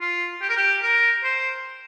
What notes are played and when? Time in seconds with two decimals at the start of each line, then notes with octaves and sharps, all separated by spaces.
0.01 F4
0.42 G4
0.49 A#4
0.57 G4
0.83 A#4
1.23 C5